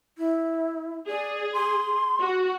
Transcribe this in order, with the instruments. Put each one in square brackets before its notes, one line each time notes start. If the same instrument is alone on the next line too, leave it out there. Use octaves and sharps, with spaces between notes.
[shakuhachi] E4
[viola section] G#4 [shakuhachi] D5
[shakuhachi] C6
[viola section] F#4